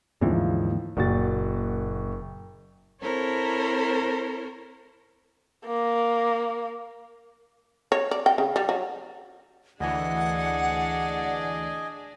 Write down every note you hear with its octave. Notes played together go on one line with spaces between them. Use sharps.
D#2 G#2 D3 E3 F3
F#1 A#2 F#4 A6
C4 E4 A4 A#4 C5 C#5
A#3
C#5
D5
G5
C#3
G3
F#3
D2 E3 D4 G#4 D5 D#5 F#5 G#5